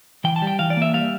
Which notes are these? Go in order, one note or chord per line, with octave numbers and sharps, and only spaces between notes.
E3 G5
A5
G3
G5
E3 F5
D5
A#3 E5
G3 F5